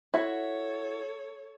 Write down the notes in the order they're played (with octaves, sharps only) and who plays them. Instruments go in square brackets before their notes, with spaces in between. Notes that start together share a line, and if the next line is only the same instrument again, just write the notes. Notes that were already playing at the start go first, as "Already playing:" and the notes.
[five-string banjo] E4 F#4 [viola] A4 C#5